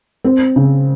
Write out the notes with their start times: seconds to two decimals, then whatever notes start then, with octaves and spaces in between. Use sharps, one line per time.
0.25 C4
0.56 C#3